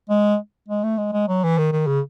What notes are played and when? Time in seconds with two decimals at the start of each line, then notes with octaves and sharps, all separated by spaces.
0.09 G#3
0.68 G#3
0.84 A3
0.98 G#3
1.13 G#3
1.28 F#3
1.44 E3
1.58 D#3
1.72 D#3
1.87 C#3